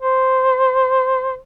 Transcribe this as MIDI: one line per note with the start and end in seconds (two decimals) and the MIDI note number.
0.02 1.37 72